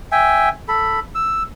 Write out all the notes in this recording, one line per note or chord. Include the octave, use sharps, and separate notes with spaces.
E5 G5 G#5
A4 B5
E6